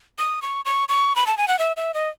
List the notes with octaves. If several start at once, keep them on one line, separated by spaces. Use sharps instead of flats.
D#6
C#6
C#6
C#6
B5
A5
G#5
F#5
E5
E5
D#5